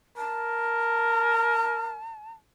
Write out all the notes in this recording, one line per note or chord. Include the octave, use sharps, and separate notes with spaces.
A#4 A5